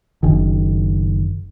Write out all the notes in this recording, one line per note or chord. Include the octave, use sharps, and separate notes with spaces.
F#1 D#3